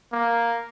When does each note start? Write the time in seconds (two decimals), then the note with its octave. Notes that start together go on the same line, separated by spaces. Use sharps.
0.13 A#3